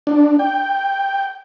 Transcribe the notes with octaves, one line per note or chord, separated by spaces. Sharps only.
D4
G5